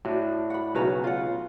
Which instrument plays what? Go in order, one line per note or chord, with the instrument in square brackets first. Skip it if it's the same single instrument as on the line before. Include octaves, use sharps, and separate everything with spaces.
[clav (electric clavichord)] A2 D4 [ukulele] F#4
[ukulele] F#5 B5
[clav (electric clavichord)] B1 C#3 [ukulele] F#4 B4 A#5
[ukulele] F4 F#5